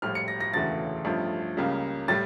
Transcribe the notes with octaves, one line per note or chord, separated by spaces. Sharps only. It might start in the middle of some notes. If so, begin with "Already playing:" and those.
A#1 A2 G3 F6
C#7
A#6
A#6
E1 D2 C#3 E3 A3 A6
A1 G2 F3 A3
C#2 C#3 G3 A#3
A2 G3 A6